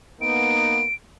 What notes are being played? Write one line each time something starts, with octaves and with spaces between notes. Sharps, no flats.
A#3 B3 D#4 D7